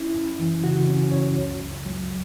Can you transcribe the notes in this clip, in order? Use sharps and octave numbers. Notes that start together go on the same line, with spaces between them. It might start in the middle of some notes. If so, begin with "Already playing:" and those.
Already playing: C#4 E4
F#2
E3
C#3 F#4
C#4
F#2 C#5
C#2
C#2
F#3